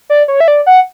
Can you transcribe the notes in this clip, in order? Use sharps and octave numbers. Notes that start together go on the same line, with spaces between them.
D5
C#5
E5
D5
F#5